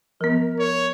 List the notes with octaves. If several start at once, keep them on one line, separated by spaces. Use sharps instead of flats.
F3 B3 A#4
C#5